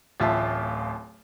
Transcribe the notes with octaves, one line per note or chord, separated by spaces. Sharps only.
D1 A1 F4 E5 A5